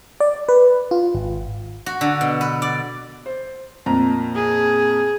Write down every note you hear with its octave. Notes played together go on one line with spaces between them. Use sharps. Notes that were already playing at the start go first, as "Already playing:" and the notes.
D5
B4
F4
G#1
F#4
D3
B2
B4
D5
C5
F2 A#2 A#5
G#4